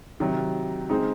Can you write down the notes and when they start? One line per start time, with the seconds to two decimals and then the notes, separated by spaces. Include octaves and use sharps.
0.20 C3 D#3 F#3
0.89 C#3 G#3 C4 D#4